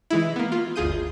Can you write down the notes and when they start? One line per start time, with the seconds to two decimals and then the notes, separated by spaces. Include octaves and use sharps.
0.10 E3 G#3 E4
0.36 A#3 B3
0.52 F4
0.76 G1 D2 F4 G#4 G6 D#7